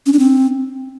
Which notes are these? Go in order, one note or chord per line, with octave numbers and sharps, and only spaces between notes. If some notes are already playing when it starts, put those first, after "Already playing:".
C#4
D4
C4